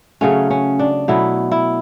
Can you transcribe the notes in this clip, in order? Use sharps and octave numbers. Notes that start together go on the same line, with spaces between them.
C#3 F#3 A3 C#4
C#4
D4
B2 F#3 A3 E4
E4